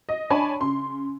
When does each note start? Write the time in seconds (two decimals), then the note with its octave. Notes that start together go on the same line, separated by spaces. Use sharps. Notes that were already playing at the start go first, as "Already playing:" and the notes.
0.09 D#5
0.30 D4 C#5 G#5 A5 B5
0.60 C#3 C6